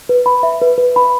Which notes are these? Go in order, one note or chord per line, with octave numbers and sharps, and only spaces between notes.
B4
B5
E5
B4
B4
B5